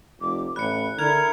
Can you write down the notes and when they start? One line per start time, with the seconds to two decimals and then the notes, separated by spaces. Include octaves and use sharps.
0.21 F1 D6
0.56 A1 B5 F#6 C#7
0.98 D3 E4 A#4 F#6 G#6 F7